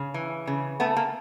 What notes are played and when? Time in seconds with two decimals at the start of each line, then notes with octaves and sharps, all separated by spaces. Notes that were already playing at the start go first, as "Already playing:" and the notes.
Already playing: C#3
0.14 E3
0.47 C#3
0.80 A3 B3
0.97 A#3